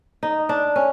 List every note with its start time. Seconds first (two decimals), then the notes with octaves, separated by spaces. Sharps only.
0.23 D#4
0.49 D4
0.76 C#4